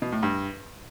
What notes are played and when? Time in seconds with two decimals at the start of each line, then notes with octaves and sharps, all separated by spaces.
0.02 B2
0.12 A2
0.23 G2